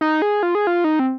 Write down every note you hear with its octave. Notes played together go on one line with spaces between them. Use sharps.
D#4
G#4
F4
G#4
F4
D#4
C4